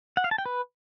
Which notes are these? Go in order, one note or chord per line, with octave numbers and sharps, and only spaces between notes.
F#5
F5
A5
G5
B4